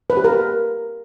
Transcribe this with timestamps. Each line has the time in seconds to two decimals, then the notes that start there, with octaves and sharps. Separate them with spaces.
0.10 B4
0.17 G4
0.24 A#4